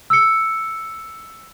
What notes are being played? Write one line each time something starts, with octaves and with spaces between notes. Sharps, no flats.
E6 C#7